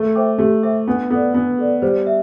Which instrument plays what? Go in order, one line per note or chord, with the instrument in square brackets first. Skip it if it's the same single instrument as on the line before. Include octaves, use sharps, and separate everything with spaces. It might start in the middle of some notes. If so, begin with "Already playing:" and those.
Already playing: [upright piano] A3
[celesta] C5 E5 G5 D6
[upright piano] A3 [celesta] G4
[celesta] C5 E5 G5 D6
[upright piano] B3 [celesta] D4
[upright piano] B3 [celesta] A4 D5
[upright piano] B3 [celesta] D4
[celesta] A4 D5
[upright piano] G3 [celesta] C5
[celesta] E5